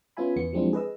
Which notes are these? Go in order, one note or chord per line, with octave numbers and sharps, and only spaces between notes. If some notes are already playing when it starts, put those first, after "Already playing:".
B3 C#4 F4 E5 G#5 B5
E2 B3 C#7
F3 F#3 G#3 C4 D4 E4
G#4 B4 D#5 E6